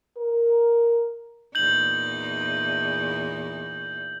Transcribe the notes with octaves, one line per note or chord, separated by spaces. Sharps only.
A#4
E2 A#2 D#4 G6 F#7